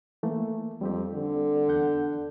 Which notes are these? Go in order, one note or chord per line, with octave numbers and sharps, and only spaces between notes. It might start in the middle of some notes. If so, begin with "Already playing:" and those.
E3 A3 A#3
F2 G3 C4 G4
D3
E2 F#5 G6